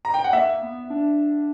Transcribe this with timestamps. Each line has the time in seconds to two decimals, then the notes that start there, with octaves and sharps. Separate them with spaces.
0.05 A#5
0.14 G5
0.24 F#5
0.33 A#3 E5
0.62 B3
0.90 D4